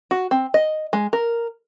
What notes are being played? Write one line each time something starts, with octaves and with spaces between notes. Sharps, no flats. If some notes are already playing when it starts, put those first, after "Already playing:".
F#4
C4
D#5
G#3
A#4